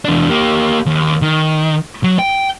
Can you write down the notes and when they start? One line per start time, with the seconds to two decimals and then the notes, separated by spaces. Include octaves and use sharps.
0.05 E2 D4
0.30 A#3 G4
0.86 D#2
1.22 D#3
2.04 F#3
2.19 G5